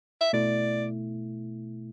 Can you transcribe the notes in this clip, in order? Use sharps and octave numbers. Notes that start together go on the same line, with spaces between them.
E5
B2 A3 E4 D5